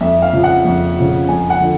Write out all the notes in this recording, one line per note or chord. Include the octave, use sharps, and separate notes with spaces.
F2 E5
F5
C#3 F3
F#5
F2
C#3 F3
F2 G#5
F#5
D3 F3